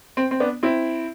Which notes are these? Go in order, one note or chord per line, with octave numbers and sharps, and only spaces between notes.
C4
C4
B3 D4
C4 E4